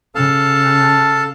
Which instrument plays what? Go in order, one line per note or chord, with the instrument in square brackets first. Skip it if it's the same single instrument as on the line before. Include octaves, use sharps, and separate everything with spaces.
[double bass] C#3 [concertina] A4 F5 A5